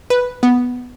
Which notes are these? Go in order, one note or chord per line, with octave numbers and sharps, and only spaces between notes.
B4
B3